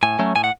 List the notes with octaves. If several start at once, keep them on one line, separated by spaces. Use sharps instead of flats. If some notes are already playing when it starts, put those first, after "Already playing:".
A2 G#5
F#3 A3 C#4
A2 G#5
F#5